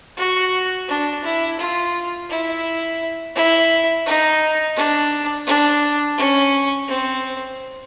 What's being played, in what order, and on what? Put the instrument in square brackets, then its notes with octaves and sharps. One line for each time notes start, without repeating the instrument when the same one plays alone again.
[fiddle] F#4
D4
E4
F4
E4
E4
D#4
D4
D4
C#4
C4